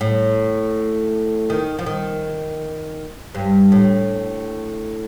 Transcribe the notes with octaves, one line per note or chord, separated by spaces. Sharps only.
A2
D#3
F3
D#3
G2
A2